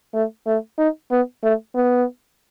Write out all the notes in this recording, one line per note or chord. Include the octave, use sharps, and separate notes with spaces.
A3
A3
D#4
B3
A3
B3